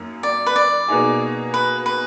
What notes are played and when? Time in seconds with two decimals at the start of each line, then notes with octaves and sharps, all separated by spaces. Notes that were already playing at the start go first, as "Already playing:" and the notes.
Already playing: F#2 A#3 D#4
0.23 D5
0.46 B4
0.56 D5
0.88 B2 A#3 D#4 G#4
1.54 B4
1.86 B4